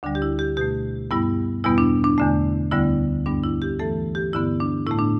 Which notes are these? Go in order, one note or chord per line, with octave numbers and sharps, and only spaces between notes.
D2 D3 G3 D4
G4
E4
G4
B2 A3 G4
G2 G3 B3 E4
E2 B2 G3 B3 E4
D4
D4
E2 D3 A3
D2 D3 G3 B3 E4
G2 G3 B3 D4
E4
G4
G2 E3 A3 A4
G4
G2 D3 B3 E4
D4
A2 A3 E4
D4